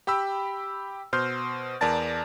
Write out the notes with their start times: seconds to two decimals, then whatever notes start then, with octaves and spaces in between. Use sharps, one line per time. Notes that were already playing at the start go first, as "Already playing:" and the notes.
0.07 G4 G5 B5 E6
1.13 B2 C5 C6 F6 G6
1.81 E2 A#4 D5 A5 A6